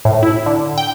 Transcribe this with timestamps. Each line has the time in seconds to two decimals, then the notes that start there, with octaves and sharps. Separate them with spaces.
0.05 A2
0.23 E4
0.46 D3
0.78 G5